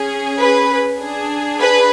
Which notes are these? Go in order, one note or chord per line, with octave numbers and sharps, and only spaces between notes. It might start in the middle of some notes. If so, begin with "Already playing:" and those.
Already playing: C#4 G#4
B4
D4 G#4
B4